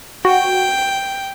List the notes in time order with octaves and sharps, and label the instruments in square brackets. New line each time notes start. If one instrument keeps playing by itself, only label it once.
[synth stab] F#4 [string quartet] G5